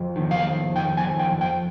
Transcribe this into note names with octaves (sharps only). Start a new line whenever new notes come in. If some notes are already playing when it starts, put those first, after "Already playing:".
Already playing: F2
D#3
F5
F2
D#3 G5
G#5
F2
G5
F2
G5